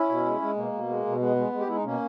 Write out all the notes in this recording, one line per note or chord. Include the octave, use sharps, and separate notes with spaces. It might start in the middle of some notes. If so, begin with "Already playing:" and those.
Already playing: C#4 E4
B2
G#3
G#3
B2 A#3
B2
G#3
B2
G#3 B3
G#3
G#3
G4
G#3 E4
D#4
B2 A#3 C#4